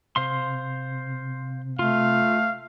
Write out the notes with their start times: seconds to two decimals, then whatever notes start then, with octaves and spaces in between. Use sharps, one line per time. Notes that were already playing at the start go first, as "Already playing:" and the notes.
0.16 C3 C5 F5 C6
1.79 A3 F4 F5